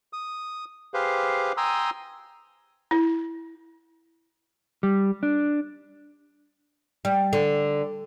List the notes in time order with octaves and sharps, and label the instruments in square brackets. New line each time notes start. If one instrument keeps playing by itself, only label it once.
[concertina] D#6
G4 G#4 B4 C5 F5
G5 G#5 A#5 C6 D#6 E6
[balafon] E4
[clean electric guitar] G3
D4
[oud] G3
D3